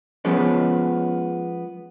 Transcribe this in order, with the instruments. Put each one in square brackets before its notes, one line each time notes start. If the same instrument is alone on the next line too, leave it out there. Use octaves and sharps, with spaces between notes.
[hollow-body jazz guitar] F3 G#3 B3 C#4